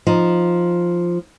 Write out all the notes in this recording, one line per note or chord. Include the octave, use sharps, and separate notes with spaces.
F3 D#4